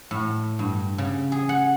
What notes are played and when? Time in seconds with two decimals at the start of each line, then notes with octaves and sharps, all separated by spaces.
0.11 A2
0.59 G2
0.98 C#3
1.32 G#4
1.49 F#5